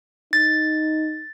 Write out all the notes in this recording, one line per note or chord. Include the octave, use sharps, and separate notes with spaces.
D#4 A6